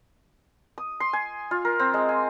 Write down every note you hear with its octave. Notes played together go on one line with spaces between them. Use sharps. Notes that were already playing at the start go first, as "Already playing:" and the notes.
D#6
C6
G#5
F4
A#4
C4
G#3
G#5